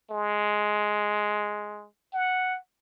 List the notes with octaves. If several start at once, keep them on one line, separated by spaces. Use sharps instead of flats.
G#3
F#5